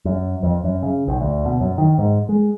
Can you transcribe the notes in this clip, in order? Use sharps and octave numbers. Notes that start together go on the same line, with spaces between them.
F#2
F2
F#2
C#3
B1
D2
B2
F#2
D#3
G#2
G#3